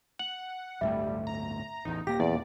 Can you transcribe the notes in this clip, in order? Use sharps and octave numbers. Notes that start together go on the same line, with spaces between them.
F#5 F#7
D1 G1 G3 A3 E5
A#5
A1 E2 D#4
D#1 A#3 G4 A#6
E2 D5